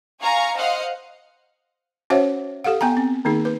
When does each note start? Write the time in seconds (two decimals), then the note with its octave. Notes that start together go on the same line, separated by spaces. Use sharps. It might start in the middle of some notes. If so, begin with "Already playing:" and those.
0.22 F5 G#5 A#5 C#6
0.56 C5 D#5 F5 F#5
2.10 C#4 F#4 C5 C#5 E5 F#5
2.64 G4 A4 F5 F#5
2.81 B3 G5 G#5 A#5
2.97 C4
3.25 D#3 A#3 D#4 G#4
3.45 B4